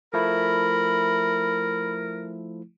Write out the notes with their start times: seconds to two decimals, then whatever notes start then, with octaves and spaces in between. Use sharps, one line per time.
0.14 F3 A3 E4 A#4 B5